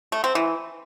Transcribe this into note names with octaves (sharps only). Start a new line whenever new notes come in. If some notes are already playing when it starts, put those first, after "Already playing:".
A3
C4
E3